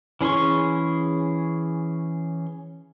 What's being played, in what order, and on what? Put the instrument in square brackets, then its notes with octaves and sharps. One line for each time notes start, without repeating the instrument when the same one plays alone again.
[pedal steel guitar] E3 C#4 G#4 C6 C#6